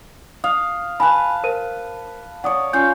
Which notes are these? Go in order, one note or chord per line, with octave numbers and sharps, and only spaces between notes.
F5 D#6
B4 G#5 A5 B5
A#4 C5 D#7
C#5 D5 F#5 D#6
C#4 F4 F5 G6